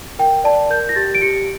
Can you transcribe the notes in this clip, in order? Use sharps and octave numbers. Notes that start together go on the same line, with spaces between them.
A#4 G5
D5 A5
A#4 G6
A#6
G4 A6
D7
G4 C#7